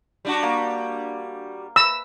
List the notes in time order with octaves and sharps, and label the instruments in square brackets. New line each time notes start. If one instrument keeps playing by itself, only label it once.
[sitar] G3 D4 F#4
[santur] A#3
[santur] B4 B5 [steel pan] E6